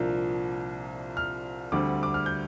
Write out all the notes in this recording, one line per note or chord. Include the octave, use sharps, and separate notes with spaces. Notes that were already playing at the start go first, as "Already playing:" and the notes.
Already playing: C2 A#2 F3 A#3 D4
F6
D2 D3 G3 C4 D6
D6
F6
G6